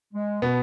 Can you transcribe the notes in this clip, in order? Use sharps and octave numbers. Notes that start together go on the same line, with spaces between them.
G#3
B2 B3